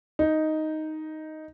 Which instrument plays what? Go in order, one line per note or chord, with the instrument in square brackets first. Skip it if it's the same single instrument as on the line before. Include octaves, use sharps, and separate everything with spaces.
[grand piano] D#4